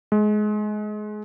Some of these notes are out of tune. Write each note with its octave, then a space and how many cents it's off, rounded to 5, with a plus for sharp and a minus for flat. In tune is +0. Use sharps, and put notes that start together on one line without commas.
G#3 +25